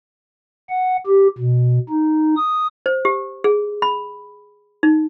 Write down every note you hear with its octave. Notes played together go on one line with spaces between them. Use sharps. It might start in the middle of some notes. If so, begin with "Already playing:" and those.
F#5
G4
B2
D#4
D#6
C5
G4
G#4
B5
D#4